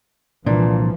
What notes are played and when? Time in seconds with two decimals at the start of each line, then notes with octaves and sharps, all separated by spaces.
0.46 C2 A#2 E3 F3 D4